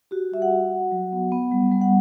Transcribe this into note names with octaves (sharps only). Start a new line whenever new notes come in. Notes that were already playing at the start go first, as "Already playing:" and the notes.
F#4 G4
G3 E5
F#5
F#4
F#4
F#3
B3
B3
G3
G3
F#5